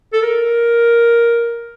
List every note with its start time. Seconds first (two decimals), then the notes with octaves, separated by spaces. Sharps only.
0.13 A4
0.23 A#4